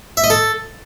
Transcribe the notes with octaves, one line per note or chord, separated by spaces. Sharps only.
E5
D#5
A4